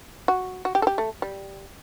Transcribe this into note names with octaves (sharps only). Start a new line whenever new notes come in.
F#4
F#4
G4
A4
G4
A3
G3